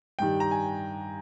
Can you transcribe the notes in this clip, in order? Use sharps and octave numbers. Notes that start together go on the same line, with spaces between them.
G2 D#3 G3 G5
A#5
G#5